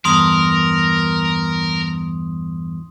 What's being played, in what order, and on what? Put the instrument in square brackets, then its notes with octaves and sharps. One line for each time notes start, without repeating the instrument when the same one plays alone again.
[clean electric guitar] E2 G2 [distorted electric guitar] A#4 [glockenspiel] C6 D#6 F#7